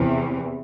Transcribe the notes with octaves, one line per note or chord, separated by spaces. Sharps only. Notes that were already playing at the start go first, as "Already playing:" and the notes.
Already playing: E2 C3 E3